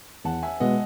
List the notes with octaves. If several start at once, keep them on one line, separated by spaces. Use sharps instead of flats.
E2 F#5 A5
E5 G#5
B2 G#3 B3 D#5 F#5